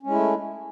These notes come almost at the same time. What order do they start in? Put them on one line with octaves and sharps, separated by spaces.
C#4 G#3 E4 A3